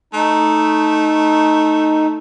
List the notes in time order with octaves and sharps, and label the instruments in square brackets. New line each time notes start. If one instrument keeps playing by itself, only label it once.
[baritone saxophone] A3 [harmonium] D#4